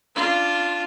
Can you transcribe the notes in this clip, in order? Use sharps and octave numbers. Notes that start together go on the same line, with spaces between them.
D4 F4